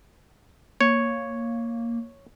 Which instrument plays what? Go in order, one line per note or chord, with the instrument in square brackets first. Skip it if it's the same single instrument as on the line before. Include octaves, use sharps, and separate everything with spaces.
[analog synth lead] A#3 [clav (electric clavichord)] C#5